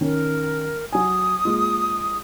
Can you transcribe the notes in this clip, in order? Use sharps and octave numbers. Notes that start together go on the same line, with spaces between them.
D#3 C#4 A#4
F#3 G#5 D#6
G#3 A#3 F4